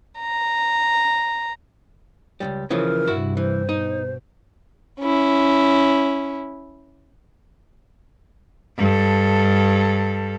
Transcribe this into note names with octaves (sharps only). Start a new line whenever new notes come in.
A#5
C#2 G#2 G3
C#3 E3 F3 A#4
G2 C3 E4 F#4
E3 C5
B2 D#4
C#4 E4
G2 A4